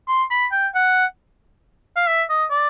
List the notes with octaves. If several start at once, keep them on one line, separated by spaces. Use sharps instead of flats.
C6
B5
G5
F#5
F5
E5
D#5
D5